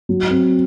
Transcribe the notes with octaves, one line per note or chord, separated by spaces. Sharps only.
F#3
C4